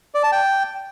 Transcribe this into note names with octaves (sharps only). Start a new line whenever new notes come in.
D5
A5
G5